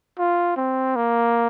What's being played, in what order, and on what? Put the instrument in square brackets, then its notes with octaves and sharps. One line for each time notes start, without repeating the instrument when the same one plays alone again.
[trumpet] F4
C4
A#3